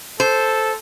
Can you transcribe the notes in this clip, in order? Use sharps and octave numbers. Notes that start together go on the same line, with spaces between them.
A4 C5